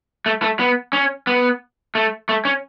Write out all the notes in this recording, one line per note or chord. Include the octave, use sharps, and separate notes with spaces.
A3
A3
B3
C#4
B3
A3
A3
C#4